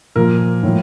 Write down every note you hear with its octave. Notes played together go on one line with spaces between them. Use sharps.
A#2 F3 A#3 A#4
A2 F3